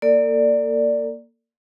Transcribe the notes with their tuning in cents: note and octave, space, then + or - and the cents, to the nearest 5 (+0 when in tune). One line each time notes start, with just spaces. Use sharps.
A#3 +0 A4 +40 D5 -5